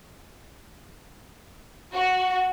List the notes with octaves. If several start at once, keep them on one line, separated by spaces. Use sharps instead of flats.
F#4